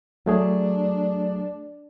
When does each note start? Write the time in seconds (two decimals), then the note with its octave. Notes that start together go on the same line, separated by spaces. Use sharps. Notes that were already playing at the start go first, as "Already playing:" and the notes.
0.26 F#3 A3 D4 G#4